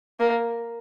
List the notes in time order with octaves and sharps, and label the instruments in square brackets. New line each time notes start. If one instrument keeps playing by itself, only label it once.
[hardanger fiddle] A#3